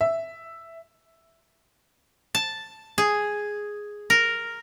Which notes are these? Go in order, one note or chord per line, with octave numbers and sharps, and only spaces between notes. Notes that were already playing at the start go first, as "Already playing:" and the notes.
E5
A5
G#4
A#4